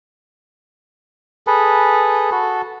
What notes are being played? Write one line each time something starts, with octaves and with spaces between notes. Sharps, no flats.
G#4 A4 B4
F#4 A4